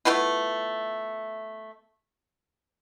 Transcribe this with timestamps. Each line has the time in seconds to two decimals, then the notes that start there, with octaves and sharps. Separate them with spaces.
0.05 A3 B3 E4 F4